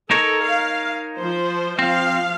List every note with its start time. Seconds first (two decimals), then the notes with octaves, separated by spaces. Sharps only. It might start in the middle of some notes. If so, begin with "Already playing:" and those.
0.11 D#4 A4 A#4 C#5
0.44 F5
1.17 F3 C5
1.79 F3 C4 F5